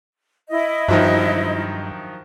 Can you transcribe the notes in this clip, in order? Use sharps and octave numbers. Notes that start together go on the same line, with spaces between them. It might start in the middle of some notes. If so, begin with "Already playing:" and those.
E4 D#5
G2 D#3 F3 F#3